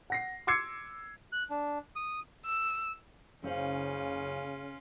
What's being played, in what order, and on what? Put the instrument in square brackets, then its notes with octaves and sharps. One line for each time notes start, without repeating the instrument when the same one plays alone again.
[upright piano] F#5 A#6 C7
C6 D6 E6 G#6 C7 C#7
[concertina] F#6
D4
D#6
[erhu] E6
[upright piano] F#1 C5 F5 [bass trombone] C#3 [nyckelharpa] C#4 F4